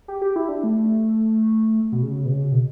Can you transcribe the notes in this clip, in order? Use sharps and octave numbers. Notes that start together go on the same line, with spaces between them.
G4
G4
E4
D4
A3
B2
C#3
B2
C#3
B2